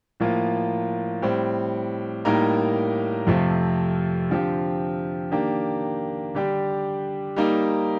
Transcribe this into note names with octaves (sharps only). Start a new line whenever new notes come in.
A2 F3 A#3 F4
A2 G3 C4
A2 G3 A#3 D#4 A#4
F2 C3 F3 A3
D3 F3 C4 G4
D#3 A#3 D4 G4
D3 G3 D4 G4
G3 A#3 D#4